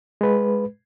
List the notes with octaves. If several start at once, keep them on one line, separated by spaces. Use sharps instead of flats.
G#3 B4